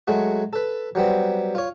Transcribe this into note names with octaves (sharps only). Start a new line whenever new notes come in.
F#3 G#3 A3 F#4
A4 B4
F#3 G3 B3 C4
F4 C#5